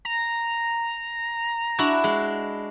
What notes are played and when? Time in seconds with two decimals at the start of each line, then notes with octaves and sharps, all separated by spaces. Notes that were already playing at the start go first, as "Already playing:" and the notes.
0.05 A#5
1.79 D4 E4 F#4
2.04 G#3